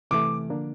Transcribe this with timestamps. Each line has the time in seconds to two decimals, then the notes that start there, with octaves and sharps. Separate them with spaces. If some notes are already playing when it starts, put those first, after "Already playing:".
0.11 C3 E3 A3 D6
0.50 D3 F3 A#3 D4